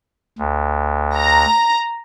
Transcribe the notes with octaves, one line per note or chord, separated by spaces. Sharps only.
D2
A#5